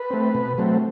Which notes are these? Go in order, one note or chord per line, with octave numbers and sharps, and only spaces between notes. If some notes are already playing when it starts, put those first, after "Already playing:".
Already playing: B4
A3 C4
B2
F#3 A3 C4